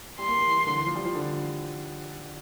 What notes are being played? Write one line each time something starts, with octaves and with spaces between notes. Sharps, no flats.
G3 C6
A#3
G3
E3
E3
D3
E3
F3
G3
F3
D3